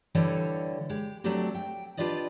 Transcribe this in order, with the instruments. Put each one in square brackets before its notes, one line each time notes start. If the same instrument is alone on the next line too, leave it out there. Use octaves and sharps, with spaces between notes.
[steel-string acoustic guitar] D3 E3 G3 A4 C#5 F5
G#3 G4
F#3 A3 C4 D4 F#4 G4
G5
D4 F4 G4 B4 D5 D#5